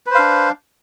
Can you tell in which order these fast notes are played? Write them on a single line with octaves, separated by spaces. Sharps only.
B4 C5 F5 D4